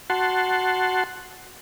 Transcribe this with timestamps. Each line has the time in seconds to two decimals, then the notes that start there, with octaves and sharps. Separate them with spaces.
0.10 F#4 F#5 A5 C6